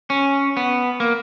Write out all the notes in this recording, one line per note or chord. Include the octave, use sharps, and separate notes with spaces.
C#4
B3
A#3